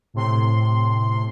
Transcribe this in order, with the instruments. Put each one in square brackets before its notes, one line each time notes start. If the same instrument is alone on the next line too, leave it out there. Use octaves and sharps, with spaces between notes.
[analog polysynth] A2 C3 C6